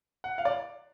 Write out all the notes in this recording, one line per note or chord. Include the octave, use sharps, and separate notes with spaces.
F#5
F5
D5